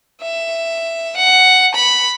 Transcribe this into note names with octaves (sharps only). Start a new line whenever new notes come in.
E5
F#5
B5